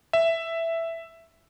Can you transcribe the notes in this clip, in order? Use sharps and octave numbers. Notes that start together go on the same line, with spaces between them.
E5